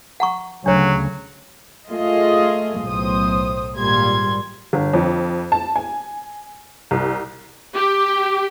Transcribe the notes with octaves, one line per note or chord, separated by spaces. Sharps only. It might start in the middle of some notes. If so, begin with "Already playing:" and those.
F#5 A#5 C#6
D2 C#3 F#3 D4 C#5
A3 F4 G#4 D#5
B1 A2 C5 D#6
G#1 A#2 G3 C6 G#6
G1
F2
A5
G#5
C2
G4